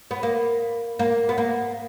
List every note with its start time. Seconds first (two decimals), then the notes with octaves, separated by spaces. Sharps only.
0.11 B3
0.23 A#3
0.99 A#3
1.29 B3
1.38 A#3